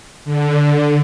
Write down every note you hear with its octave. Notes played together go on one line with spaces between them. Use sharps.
D3